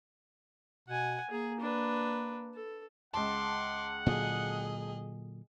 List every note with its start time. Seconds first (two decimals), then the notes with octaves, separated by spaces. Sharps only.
0.89 B2 F#5 G#5
1.31 A#3 G#4
1.61 D4 B4
2.55 A4
3.14 C#2 F#5 A5 C6 D6
4.06 A#2 D3 F#3 G#4 D#5